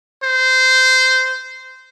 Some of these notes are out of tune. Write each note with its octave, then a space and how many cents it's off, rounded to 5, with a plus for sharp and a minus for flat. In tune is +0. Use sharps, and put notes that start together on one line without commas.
C5 -15